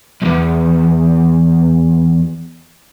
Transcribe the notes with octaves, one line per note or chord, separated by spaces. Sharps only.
B1 E2